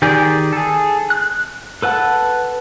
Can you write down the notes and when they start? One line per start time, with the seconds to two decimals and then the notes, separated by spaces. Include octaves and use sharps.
0.02 D#3 G4 G#4 D5
0.52 G#4 A4
1.10 F#6
1.82 A4 B4 F#5 A5